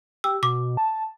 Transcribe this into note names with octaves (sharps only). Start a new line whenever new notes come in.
G4 E6
B2 D6
A5